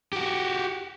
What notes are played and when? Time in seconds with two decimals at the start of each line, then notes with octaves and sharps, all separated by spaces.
0.13 F#4 G4